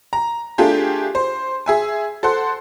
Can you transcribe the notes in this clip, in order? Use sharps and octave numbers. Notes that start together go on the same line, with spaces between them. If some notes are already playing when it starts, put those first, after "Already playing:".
A#5
A3 D4 F4 G4 G#4
C5
G#4 E5 G#5
A4 C5 F#5 C6